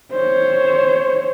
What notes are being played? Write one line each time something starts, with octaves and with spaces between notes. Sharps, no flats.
C5 C#5